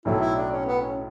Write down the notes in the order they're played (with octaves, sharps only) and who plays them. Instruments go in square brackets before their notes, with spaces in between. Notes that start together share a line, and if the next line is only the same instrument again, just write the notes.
[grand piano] B1 A2 F#3 A3 [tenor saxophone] E4
[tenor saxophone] E4
D4
C#4
B3
C#4